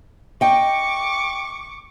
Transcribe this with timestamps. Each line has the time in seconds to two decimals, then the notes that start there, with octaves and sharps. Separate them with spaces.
0.41 D#5 G5 C#6 D6